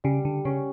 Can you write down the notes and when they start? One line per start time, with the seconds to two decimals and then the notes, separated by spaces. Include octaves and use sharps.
0.04 C#3 G3
0.25 D3
0.45 C#3 C#4